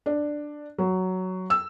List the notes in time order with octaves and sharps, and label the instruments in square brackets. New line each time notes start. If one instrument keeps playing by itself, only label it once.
[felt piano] D4
F#3
E6